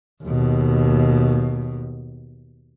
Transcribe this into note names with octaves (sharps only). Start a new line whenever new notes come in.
D#2 B2